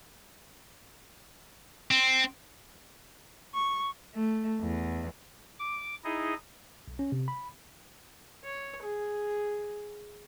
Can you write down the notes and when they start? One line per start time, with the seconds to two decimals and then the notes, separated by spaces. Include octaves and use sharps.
1.91 C4
3.54 C#6
4.15 A3
4.60 E2
5.60 D6
6.04 D#4 E4 G#4 D#5
6.88 B1
6.99 C#4
7.12 C3
7.28 B5
8.44 C#5
8.82 G#4